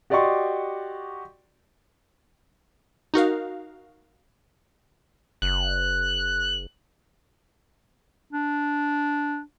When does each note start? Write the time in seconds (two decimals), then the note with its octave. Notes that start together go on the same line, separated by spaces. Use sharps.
0.10 F#4 G4 D5 D#5 C6 C#6
3.14 D#4 F#4 A#4 F5
5.42 F#1 F#6
8.33 D4